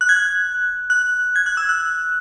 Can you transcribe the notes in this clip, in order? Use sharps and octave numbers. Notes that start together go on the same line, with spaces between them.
F#6
G#6
F#6
F#6
G#6
F#6
E6
F#6